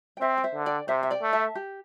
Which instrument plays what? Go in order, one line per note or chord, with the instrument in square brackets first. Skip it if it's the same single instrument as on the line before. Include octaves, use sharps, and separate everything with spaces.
[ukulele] G5
[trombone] C4 [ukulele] C5 E5
[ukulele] G5
C5 E5
[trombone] D3
[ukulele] D5 G5
[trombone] C3 [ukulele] C5 E5
[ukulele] E5
D5 G5
[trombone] A3
[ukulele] E5 A5
G4